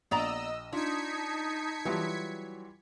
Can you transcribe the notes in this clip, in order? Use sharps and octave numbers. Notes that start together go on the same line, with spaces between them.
A#1 B3 D5 D#5 A#5 E6
D4 D#4 F4 A5 G#6 B6 C#7
E3 F#3 G3 F4